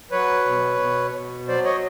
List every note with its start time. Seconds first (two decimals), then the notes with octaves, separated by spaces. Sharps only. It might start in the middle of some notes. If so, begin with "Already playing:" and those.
0.11 F#3 B4 C#5
0.46 B2
0.79 B2
1.14 B2
1.48 F#3 C5 D5
1.64 C#5 D#5